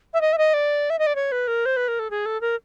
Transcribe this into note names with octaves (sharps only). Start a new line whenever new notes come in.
E5
D#5
E5
D#5
D5
E5
D#5
D5
C#5
B4
A#4
C5
B4
A#4
A4
G#4
A4
A#4